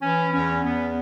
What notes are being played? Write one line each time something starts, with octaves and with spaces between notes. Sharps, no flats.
E3 C#4
E2 C#4
E2 B3